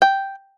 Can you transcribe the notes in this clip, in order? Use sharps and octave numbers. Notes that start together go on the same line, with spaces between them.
G5